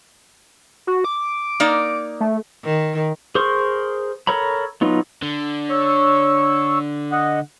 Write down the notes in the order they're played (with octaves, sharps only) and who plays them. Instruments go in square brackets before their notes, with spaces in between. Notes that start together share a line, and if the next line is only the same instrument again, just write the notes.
[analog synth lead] F#4
D6
[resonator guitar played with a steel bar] A#3 D#4 D5
[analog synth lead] A3
[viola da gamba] D#3
[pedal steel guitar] G#4 A#4 C5 C6 C#6
A4 A#4 C#5 A#5 B5
F#3 B3 D#4 F4
[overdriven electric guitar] D3
[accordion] C#5 C#6 E6
D#5 F#5